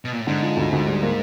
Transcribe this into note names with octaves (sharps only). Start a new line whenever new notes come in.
B2
A#2
A2
G#2 D3
F3
D2
D2
G3
A#3